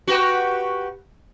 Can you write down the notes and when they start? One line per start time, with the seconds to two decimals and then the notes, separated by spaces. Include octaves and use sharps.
0.07 F#4 G4 B4